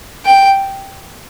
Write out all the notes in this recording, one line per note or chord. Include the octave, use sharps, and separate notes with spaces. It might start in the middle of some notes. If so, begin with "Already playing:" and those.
G5